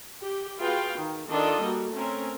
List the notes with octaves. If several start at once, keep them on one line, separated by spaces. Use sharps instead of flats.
G4
F4 F#4 G#4 B4 F5 G5
D#3
D#3 D4 F4 A4 D#5
G3 A#3 F#4
A3 C4 C#4 A#4